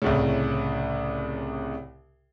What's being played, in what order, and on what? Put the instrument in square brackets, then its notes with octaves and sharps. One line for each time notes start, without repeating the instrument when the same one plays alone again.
[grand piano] C2 A2 C#3